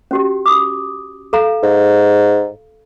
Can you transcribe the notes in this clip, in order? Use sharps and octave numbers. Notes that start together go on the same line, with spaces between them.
C#4 F#4 G4
D6 D#6
A4 F5 A#5
G#2